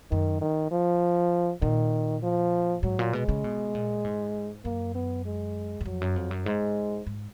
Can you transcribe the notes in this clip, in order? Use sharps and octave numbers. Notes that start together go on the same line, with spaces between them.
F#2 D#3
D#3
F3
A#2 D#3
F3
G#2 F#3
A#2
B2 G#3
C#3
B2
A#2
G#2
F#2 A#3
B3
G#3
F#2
F2 F#3
F#2
F2
F#2
G#2 G#3
G#2